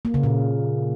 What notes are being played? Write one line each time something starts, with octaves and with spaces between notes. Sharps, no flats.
A#3
C#3
A#2